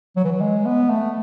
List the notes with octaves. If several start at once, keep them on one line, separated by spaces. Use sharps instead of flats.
F#3
E3
F#3
G#3
B3
A3